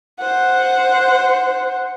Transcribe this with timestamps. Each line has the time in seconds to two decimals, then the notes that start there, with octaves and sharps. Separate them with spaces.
0.19 C5 F#5